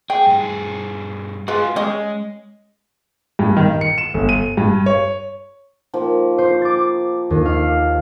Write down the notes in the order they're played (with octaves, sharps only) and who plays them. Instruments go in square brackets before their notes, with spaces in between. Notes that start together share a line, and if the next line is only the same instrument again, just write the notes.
[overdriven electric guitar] G#4 [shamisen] G5
[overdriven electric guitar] G2 G#4
[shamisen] G#3 F4 B4 [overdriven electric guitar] F#4 G#4
[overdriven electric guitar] G#3 [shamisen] C#4 D#5
[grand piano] G2
D#3
C#7
E7
G1
D#7
G2
C#5
[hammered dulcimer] D#3 F3 A#3
[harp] C5
D6 A6
D#2
F5